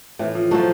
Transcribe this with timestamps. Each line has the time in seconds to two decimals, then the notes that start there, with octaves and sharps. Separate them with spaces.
0.19 A2 E3
0.35 F3
0.51 F#3 A3
0.54 F3